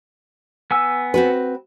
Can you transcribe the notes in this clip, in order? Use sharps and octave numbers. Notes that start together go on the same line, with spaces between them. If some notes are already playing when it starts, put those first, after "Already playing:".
B3 G#5 E6
C4 F#4 B4